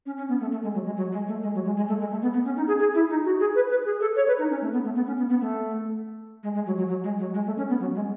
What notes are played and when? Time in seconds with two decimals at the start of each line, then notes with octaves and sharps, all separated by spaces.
0.06 C#4
0.17 C#4
0.29 B3
0.40 A3
0.51 A3
0.63 G#3
0.74 F#3
0.86 G#3
0.97 F#3
1.12 G#3
1.28 A3
1.43 G#3
1.54 F#3
1.65 G#3
1.77 G#3
1.88 A3
2.00 G#3
2.11 A3
2.22 B3
2.34 B3
2.45 C#4
2.56 D#4
2.68 G#4
2.79 G#4
2.94 E4
3.10 D#4
3.25 F#4
3.40 G#4
3.55 B4
3.70 B4
3.85 G#4
4.01 A4
4.16 C#5
4.27 B4
4.39 D#4
4.50 C#4
4.61 A3
4.73 B3
4.84 A3
4.95 B3
5.07 C#4
5.18 B3
5.29 B3
5.41 A3
6.43 G#3
6.55 G#3
6.66 F#3
6.78 F#3
6.88 F#3
7.04 G#3
7.19 F#3
7.34 G#3
7.46 A3
7.57 C#4
7.69 B3
7.80 F#3
7.95 G#3